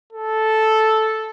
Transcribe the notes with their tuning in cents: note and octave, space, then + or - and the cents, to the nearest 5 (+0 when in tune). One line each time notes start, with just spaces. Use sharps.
A4 -5